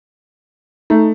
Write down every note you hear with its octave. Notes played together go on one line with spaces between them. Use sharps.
A3 D#4